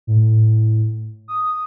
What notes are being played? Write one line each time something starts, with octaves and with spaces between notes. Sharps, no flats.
A2
D#6